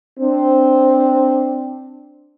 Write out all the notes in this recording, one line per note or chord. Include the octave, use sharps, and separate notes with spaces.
C4 D4